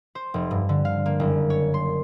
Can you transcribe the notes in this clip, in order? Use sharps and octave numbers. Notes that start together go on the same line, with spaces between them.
C5
F1
G2
D3
F5
A#3
F#1
C#5
C6